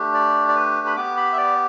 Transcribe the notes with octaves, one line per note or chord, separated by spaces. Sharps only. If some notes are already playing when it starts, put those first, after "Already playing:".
Already playing: A3 D4 G4
D5
D5
B4
B5
B3 G4 D6
B5
E5
D5